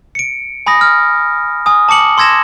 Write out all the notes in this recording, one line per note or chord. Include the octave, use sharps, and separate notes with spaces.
C#7 D7
G#5 B5 D#6 A#6
F6
G#5 D#6
A5 D6 C#7 F#7
C6 E6 G#6 A#6 E7